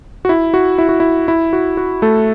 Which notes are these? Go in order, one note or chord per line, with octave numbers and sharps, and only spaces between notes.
F#4
E4
F#4
E4
F#4
E4
E4
F#4
F#4
A3 A4